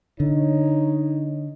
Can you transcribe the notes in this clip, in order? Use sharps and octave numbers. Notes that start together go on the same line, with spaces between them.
D3 D#4 C#5